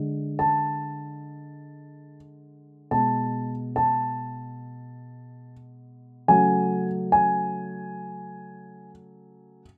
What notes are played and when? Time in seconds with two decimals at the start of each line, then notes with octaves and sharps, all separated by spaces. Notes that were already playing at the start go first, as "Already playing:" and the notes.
Already playing: D3 G#3
0.39 A5
2.91 B2 G#3 A5
3.76 A5
6.28 C#3 F#3 A3 G#5
7.12 G#5